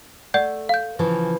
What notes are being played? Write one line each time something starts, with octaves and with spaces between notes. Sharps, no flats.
A3 D5 F#5 G6
F5 G6
C#3 E3 F3